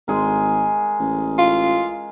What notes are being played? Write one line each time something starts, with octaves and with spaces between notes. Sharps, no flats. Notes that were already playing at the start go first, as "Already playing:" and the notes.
G#1 G#3 G#4 A#4
A1
F4